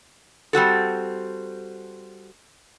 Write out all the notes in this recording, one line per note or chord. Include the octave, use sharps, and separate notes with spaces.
G3 C4 F#4 A4